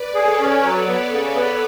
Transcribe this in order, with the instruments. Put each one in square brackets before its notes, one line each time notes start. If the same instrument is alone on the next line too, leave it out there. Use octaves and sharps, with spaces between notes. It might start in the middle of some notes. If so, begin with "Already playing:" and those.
Already playing: [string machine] B4 D5
[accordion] G#4 [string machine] A4 C#5
[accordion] C#4
F#3
B3
C#3
B3